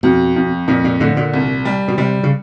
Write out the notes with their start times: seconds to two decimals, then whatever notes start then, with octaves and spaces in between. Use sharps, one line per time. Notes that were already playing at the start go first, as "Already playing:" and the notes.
0.03 F2 B2
0.36 F2
0.68 F2 A#2
0.84 A#2
1.00 A2 D3
1.17 A#2
1.34 C2
1.65 G3
1.88 B2
1.98 C3 G3
2.23 C#3